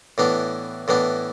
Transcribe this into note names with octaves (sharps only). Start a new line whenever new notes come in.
A2 E3 B3 D4
A2 E3 B3 D4